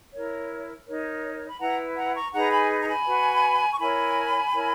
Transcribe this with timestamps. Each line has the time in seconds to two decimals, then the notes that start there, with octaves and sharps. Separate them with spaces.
0.13 E4 A#4 C#5
0.87 D#4 A#4 C#5
1.48 B5
1.60 E4 B4 F#5 A#5
1.96 F#5 A#5
2.15 A#5 C#6
2.33 D#4 G#4 B4 F#5 A#5
2.52 G#5 B5
2.82 A#5
2.88 G#5 B5
3.06 F#4 B4
3.72 C#6
3.80 E4 A#4 C#5 G#5 B5
4.54 E4 A#4 C#5